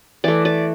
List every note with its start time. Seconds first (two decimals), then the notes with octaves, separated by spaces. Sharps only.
0.24 E3 A3 D5
0.45 D5